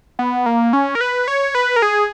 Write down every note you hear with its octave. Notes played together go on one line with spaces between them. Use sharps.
B3
A#3
C#4
A#4
B4
C#5
B4
A#4
G#4